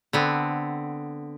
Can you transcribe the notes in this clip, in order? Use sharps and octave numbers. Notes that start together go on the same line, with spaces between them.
D3 B3 C4